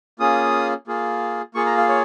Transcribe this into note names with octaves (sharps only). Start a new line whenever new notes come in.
A#3 C#4 F4 G#4 D#6
A#3 F4 G#4
A#3 F4 G#4 C#6
A#5
F5
C#5